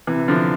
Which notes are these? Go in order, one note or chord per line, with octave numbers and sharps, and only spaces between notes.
C3 E3
D3 F3